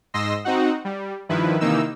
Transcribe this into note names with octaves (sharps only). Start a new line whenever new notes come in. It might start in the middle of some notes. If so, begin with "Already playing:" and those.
G#2 D#5 C6 E6 A#6
C4 D#4 F#4 F#5
G3
G2 D#3 F3 E4 B4
C3 D#3 E3 A#3 D#4 E6